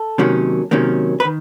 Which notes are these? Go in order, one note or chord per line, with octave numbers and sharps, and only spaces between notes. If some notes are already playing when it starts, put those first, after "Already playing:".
Already playing: A4
C3 D#3 F#3 A#3 C#4
C3 D#3 F#3 A#3 C#4
B4
D#3